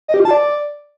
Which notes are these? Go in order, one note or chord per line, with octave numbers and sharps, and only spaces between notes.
D#5
G4
F4
A5
D5